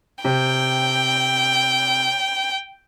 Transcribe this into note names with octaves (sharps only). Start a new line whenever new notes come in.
C3 G5